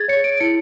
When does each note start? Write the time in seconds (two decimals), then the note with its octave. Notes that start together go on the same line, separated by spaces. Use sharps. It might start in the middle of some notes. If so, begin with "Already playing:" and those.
Already playing: G#4 G#6 A6
0.08 C#5 C#7
0.24 D7
0.40 E4 C#7